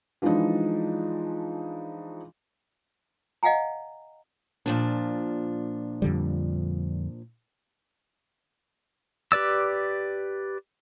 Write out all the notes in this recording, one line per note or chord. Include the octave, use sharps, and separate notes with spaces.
E3 F3 G#3 D4 D#4
D#5 F5 F#5 G#5 A#5
A#2 F3 D4
F2 D3 G3
G4 B4 D5 E6